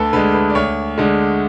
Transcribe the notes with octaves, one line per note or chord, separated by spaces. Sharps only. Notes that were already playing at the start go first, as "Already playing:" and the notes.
Already playing: D2 A4 B4
D3 G#3 B4
B4
D5
D2 C#5
D3 G#3